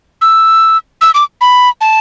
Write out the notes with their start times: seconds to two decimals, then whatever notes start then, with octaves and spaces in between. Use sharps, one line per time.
0.22 E6
1.01 E6
1.14 D6
1.41 B5
1.81 A5